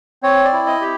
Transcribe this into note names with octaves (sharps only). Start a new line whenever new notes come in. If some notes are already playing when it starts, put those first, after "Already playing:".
C4 C#5
D5
E4
D#5
G4